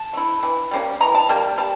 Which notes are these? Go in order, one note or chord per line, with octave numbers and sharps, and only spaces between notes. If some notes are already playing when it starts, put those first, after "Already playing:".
Already playing: A5
A3 E4
E3
G3 A#3 C#4
E3 A#5
A5
G3 A#3
G3 A5